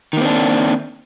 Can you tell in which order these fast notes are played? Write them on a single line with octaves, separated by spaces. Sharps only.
D#3 A#3 C4 D4